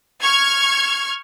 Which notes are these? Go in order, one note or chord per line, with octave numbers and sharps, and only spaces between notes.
C#6 F6 G#6